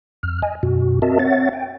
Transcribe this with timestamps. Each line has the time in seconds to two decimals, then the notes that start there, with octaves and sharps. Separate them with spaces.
0.23 F2 F6
0.42 D#5 G#5
0.63 F#2 B2 F#4
1.02 C4 F#4 A#4 D#5 E5 A5
1.19 C4 C#5 E5 F#5 A6
1.53 G5